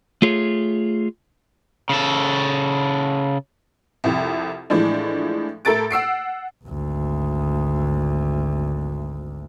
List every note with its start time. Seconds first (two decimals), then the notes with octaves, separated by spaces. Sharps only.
0.22 A3 F4 G#4 C#5
1.90 C#3 A4
4.04 C2 F2
4.70 A2 E3 F3 G#3 D4
5.65 A2 E4 A4 A#4 A6 D7
5.91 F#5 E6 C7 D7
6.64 G#1 D2